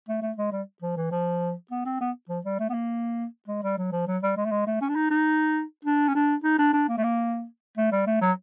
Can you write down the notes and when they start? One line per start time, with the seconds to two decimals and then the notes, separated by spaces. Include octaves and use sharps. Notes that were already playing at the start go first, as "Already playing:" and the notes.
0.08 A3
0.22 A3
0.37 G#3
0.52 G3
0.82 F3
0.97 E3
1.11 F3
1.71 B3
1.85 C4
2.01 B3
2.29 F3
2.45 G3
2.59 A3
2.69 B3
2.74 A#3
3.48 G#3
3.63 G3
3.78 F#3
3.92 F3
4.07 F#3
4.23 G3
4.36 G#3
4.45 A3
4.51 G#3
4.67 A3
4.81 C#4
4.89 D4
4.95 D#4
5.10 D#4
5.85 D4
6.08 C#4
6.15 D4
6.44 D#4
6.58 D4
6.73 D4
6.88 A#3
6.98 A3
7.03 A#3
7.77 A3
7.92 G3
8.07 A3
8.21 F#3